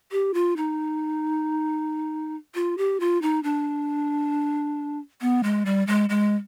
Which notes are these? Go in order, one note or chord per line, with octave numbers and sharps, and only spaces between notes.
G4
F4
D#4
F4
G4
F4
D#4
D4
B3
G#3
G3
G#3
G#3